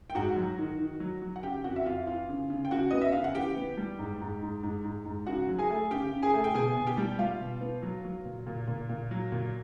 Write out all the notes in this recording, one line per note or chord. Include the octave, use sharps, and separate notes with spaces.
G5
G#2 F#4 F#5
F#3
D#3
D#3
F#3
F#3
F#5
C#3 G4 G5
F2 F#4 F#5
E5
F2 F4 F5
E3 F4 F5
C#3
C#3
G5
C#3 F#4 F#5
B3 D#5
E5
C#3 F5
F#5
E3 G4 G5
B3
G3
G#2
G#2
G#2
G#2
G#2
G#2
C#3 F#4 F#5
F#3
G#4 G#5
A3
C#3 G4 G5
C#3
G#4 G#5
A3
G5
B2 G#4 G#5
B2
G4 G5
G3
G3 F4 F5
B2
B3
F#3
F#3
A#2
A#2
A#2
A#2
F#3
A#2